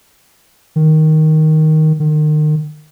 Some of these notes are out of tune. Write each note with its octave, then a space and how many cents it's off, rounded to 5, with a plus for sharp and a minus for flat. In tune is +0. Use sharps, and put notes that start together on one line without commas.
D#3 +5
D#3 -35